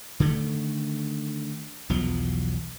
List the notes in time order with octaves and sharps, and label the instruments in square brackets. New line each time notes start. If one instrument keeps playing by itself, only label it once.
[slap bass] D3 D#3 A3
B1 E2 F3 F#3